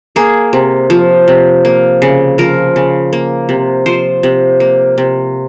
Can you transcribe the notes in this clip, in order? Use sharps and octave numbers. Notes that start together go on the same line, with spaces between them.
A#3 G#4
C3
F3
C3
A#3
C#3
F3 A#4
C#3
A#3
C3
F3 C5
C3
A#3
C3